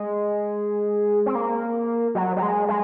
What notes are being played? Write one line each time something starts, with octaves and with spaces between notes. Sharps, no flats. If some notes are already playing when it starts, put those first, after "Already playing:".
Already playing: G#3
C4
A#3
F#3
F#3
G#3
G#3